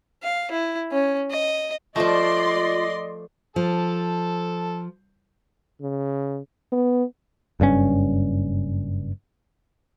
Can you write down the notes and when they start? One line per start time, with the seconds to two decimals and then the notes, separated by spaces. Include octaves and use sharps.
0.23 F5
0.51 E4
0.92 C#4
1.31 D#5
1.96 F3 A3 F4 D5 D#5 C6
3.56 F3 A4 A5
5.82 C#3
6.72 B3
7.60 F#1 G2 B2 C#4